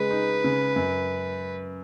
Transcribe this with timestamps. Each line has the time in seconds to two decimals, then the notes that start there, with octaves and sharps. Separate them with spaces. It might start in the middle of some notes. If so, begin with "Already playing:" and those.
Already playing: C#3 G#3 B4
0.11 D#4
0.44 C#3
0.76 F#2